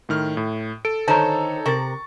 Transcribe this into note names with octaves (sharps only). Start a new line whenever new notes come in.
A2 D#3 F6
A2
A4 D7
D3 D#3 D#4 A4 C5 C#5 A5 A#5
C3 A#4 C#6 A6